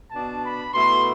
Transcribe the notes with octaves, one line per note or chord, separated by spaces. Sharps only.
B2 B3 D4 A5
B5
B2 A3 E4 C6